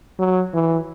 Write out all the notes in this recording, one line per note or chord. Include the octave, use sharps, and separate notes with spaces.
F#3
E3